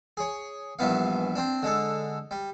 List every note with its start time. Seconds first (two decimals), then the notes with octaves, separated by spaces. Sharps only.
0.17 G#4 C#5
0.79 A#1 G2 E3 B3 F5
1.35 C4 D4
1.63 D3 G#3 A4
2.31 G3